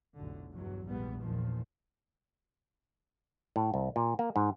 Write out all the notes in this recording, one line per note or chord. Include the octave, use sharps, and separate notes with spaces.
F1 B1 A2 D3
G1 E2 G2 F#3
A#1 E2 G#2 G3 B3
E2 A#2 D#3 F3
A2
C2
A#2
A#3
G#2